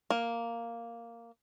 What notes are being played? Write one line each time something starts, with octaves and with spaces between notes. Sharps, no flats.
A#3